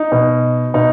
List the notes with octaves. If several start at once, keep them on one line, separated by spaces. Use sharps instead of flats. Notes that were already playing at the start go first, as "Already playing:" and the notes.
Already playing: D#4
B2
B2 D#4